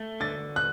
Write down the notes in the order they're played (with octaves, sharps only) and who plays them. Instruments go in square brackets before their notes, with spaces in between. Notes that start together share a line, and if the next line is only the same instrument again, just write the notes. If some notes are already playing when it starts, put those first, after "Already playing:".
Already playing: [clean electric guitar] A3
[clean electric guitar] D3 [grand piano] A6
[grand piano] F#6